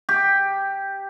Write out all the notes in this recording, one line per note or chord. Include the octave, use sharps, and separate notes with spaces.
G4